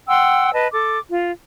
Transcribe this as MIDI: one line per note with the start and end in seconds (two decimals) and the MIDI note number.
0.08 0.50 78
0.08 0.50 79
0.08 0.50 84
0.08 0.50 88
0.53 0.67 71
0.53 0.67 75
0.53 0.67 81
0.73 0.98 69
0.73 0.98 86
1.08 1.31 65